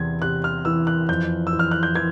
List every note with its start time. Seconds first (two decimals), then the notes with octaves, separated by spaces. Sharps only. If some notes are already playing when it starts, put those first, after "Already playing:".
Already playing: E2 C3 G#6
0.22 C3 F#6
0.44 F6
0.65 E3 E6
0.87 F#6
1.09 F2 G6
1.47 E6
1.53 E3
1.59 F6
1.71 F#6
1.83 G6
1.95 E3 G#6